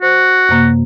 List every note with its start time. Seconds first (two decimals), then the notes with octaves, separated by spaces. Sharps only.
0.02 F#4 C5
0.49 F#2 C3 A#3